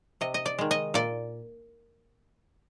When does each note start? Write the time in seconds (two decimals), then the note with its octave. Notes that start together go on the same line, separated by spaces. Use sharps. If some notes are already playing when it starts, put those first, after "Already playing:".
0.21 C3 D#5
0.34 D#5
0.46 D5
0.59 D#3 G#3
0.71 D#5
0.94 A#2 D5